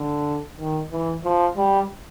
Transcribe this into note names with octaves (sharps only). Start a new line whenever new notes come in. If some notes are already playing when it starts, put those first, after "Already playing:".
Already playing: D3
D#3
E3
F3
G3